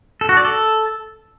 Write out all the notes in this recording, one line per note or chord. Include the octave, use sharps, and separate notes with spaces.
A4
F#4
D5
A4